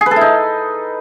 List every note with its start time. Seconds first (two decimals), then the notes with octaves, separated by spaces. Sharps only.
0.01 G#4
0.06 B4
0.11 A4
0.16 E4
0.21 D#4